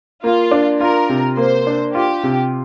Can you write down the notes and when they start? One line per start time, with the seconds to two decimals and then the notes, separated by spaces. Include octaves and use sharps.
0.24 A#3 F4
0.51 D4
0.80 F4 A#4
1.09 C3
1.37 A#3 C5
1.67 D4
1.95 F4 G4
2.23 C3